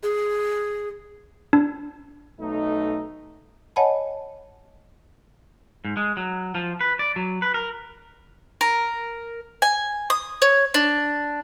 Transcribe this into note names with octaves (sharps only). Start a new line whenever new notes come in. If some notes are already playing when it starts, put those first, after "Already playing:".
G#4
D4
B1 A3 D#4
C#5 D#5 F#5 G#5 A5 B5
G#2
G#3
F#3
F3
B4
D5
F#3
B4
A#4
A#4
G#5
D#6
C#5
D4